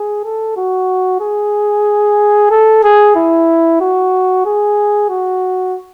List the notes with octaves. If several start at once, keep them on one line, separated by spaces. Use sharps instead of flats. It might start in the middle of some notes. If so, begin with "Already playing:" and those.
Already playing: G#4
A4
F#4
G#4
A4
G#4
E4
F#4
G#4
F#4